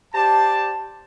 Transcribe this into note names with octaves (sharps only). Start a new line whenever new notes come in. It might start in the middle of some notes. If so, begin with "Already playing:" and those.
G4 C5 D5 A5